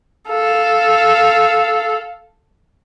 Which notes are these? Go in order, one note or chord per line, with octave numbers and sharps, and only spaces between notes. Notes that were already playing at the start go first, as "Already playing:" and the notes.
A4 F5